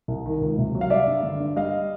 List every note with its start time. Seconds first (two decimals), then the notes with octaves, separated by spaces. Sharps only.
0.08 C2
0.26 D#3
0.41 C#2
0.58 C3
0.75 F#3
0.81 F5
0.90 G3 D5 E5
1.07 G2
1.23 D3
1.40 G2
1.56 G3 D#5 F5